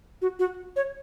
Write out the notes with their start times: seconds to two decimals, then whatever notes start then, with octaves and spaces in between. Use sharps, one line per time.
0.22 F#4
0.39 F#4
0.76 C#5